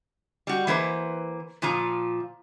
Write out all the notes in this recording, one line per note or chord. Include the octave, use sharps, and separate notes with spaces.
G3 F#4
E3 A#3 B4 C5
A#2 F3 F4 A#5